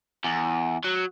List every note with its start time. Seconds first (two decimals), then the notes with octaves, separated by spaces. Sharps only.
0.24 E2
0.84 F#3